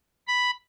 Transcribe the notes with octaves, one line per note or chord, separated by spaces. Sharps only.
B5